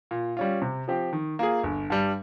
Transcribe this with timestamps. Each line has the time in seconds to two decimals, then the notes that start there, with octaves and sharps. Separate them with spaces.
0.11 A#2
0.37 G3 C#4 F4
0.62 C3
0.88 F3 C4 G4
1.13 D#3
1.39 A#3 F4 G#4
1.63 G1
1.90 G2 G3